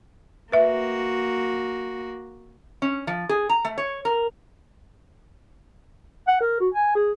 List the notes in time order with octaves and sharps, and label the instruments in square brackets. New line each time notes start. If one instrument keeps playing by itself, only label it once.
[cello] A#3 F#4 [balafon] B4 E5
[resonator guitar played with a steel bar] C#4
F3
G#4
A#5
A3
C#5
A#4
[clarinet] F#5
A#4
F#4
G#5
G#4